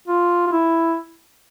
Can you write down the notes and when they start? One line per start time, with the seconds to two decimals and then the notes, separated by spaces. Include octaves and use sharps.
0.08 F4
0.47 F4
0.52 E4